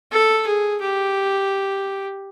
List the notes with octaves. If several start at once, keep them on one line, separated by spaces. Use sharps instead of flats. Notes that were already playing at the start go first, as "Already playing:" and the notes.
A4
G#4
G4